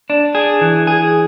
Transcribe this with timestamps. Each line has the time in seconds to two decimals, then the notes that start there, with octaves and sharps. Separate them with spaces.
0.10 D4
0.35 G#4
0.61 E3
0.87 G#4